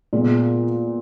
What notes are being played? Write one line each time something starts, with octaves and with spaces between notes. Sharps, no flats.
A#2 G#3 B3